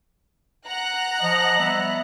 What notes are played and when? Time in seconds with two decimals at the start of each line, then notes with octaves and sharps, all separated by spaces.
0.66 F#5 A#5 F#6
1.20 F3 D#5
1.58 G3 B3 E5